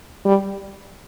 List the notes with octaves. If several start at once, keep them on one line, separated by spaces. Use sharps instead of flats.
G3